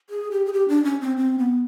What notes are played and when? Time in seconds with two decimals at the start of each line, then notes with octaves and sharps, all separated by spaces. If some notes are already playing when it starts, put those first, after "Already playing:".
0.10 G#4
0.31 G4
0.46 G#4
0.53 G4
0.69 D4
0.85 C#4
1.01 C4
1.17 C4
1.39 B3